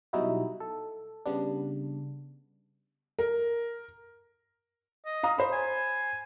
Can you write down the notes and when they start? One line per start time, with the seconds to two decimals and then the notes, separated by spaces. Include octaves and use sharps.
0.13 B2 F#3 G3 D#4 E4 F#4
0.60 A4
1.26 C#3 G3 B3 D4
3.19 A#4
5.06 D#5
5.23 F5 A#5 D#6
5.38 C5 B5
5.53 G#5